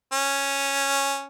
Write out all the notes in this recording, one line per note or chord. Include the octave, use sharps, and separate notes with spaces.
C#4